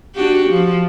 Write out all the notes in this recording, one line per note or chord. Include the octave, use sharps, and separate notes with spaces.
D4 F#4 G4
F3